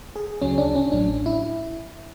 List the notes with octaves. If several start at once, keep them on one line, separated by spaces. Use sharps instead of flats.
G#4
D2 C#3 F#3 C#4
D4
C#4
A1 A2 F#3 D4
E4